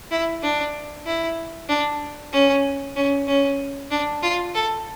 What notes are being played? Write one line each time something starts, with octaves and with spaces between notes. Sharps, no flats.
E4
D4
E4
D4
C#4
C#4
C#4
D4
F4
A4